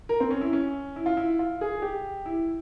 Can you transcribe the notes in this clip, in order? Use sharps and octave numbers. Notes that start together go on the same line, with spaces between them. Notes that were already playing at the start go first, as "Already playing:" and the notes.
A#4
C4
C#4
E4
C#4
E4
F4
E4
F4
G#4
G4
E4